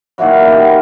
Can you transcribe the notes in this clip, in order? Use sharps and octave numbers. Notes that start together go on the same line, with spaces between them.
A#2 D#3 E3 F#3
B3 G4
F4 A#4